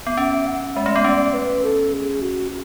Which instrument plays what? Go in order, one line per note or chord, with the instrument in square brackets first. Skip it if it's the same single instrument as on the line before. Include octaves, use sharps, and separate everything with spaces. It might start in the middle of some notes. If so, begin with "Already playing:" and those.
[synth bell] B3
[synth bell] C#4 [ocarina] E5
[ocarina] F#5
[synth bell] G#3 [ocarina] E5
[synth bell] A3
B3
[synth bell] C#4 [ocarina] D5
[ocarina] B4
A4
G#4
F#4